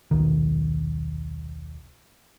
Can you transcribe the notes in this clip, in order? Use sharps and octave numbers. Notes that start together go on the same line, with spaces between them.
D#1 B1 D#3